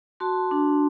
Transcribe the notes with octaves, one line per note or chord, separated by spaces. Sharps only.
F#4 A5 C6
D4